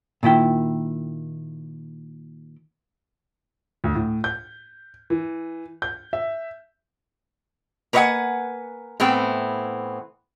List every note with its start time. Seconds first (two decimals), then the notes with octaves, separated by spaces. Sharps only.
0.23 A#2 D#3 E4 G5
3.84 D2
3.95 A2
4.24 G6
5.10 E3
5.82 G6
6.13 E5
7.93 A#3 B4 C#5 D#5 F#5 G#5
9.00 A2 E3 B3 C4